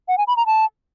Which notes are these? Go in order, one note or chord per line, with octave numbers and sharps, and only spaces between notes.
F#5
G#5
B5
A#5
A5